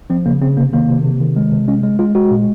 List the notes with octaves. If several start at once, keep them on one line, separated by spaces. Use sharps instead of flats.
F3 C4
C#3 A#3
C#3 C4
C3 A#3
D#3 A#3
C3
C3
D#3
G#3
C3
G#3 C#4
G#3
G#3 F4
G#3 F#4
A#2